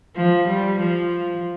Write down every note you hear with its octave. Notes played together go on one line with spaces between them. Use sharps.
F3
G3
F3